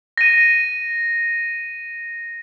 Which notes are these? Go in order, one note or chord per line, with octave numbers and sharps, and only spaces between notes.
A#6 D#7